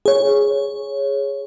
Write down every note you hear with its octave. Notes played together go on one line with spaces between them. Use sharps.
G#4 C#5